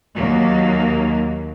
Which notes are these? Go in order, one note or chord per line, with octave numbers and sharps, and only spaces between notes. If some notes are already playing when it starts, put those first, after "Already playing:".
D#2 F#3 A#3